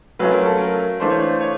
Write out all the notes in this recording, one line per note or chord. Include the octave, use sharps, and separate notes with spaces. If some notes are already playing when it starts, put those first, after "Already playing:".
F#3 A3 C#4 F4 B4
A#4
A4
A#4
E3 A3 D4 F4 C5
C#5
C5
C#5